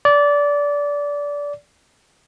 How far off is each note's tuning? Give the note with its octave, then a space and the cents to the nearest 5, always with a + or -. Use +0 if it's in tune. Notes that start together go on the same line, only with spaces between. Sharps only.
D5 -20